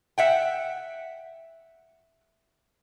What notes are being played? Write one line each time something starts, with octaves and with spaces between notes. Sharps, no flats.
E5 F#5 G5